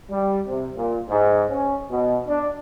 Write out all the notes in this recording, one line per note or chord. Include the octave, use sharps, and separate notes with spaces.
G3
C3
A#2
G#2
C#4
B2
D4